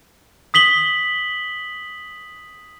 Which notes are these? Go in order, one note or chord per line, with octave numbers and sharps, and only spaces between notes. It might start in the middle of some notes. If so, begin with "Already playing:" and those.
D#6 B6 F#7 G7